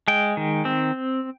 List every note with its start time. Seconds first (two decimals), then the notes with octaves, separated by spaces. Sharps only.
0.08 G#3 G5
0.37 D#3
0.65 C4